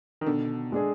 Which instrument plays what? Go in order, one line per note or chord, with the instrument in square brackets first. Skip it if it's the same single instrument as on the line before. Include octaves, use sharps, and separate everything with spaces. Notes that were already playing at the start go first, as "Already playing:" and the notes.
[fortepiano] D#3
[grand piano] B2 [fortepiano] D3
[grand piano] G#3 D4 G#4